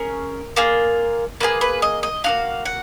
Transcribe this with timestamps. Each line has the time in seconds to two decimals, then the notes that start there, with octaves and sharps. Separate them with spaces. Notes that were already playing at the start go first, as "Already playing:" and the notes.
Already playing: C#4 G#4 A#4
0.56 A#3 F4 G#4
1.40 A#3 F4 G#4 B4
1.61 B4
1.82 D#5
2.03 D#5
2.24 A#3 D#4 F#4 F5
2.65 F#5